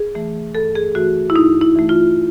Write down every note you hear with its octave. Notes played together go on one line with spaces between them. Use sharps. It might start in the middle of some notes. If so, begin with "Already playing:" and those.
Already playing: G#4
E3 A3
G2 A4
G#4
E3 A3 F#4
E4
G2 D#4
E4
E3 A3
F4